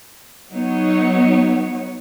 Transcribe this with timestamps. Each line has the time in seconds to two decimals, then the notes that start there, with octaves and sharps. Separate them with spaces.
0.51 F#3 B3 D#4 C#5